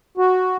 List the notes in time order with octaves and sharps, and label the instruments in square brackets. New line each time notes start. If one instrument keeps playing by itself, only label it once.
[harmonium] F#4